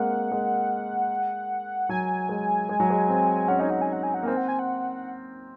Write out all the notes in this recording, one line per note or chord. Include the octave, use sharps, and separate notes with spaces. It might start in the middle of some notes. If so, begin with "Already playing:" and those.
Already playing: G#3 A#3 C4 F#5
G#3
F#3 G#5
G#3
G#3
F#3
G#3
C4
C#4 F#5
D#4 G#5
C#4 F#5
G#5
F#5
G#5
F#5
A#3
C4 G#5
F#5
G#5
F#5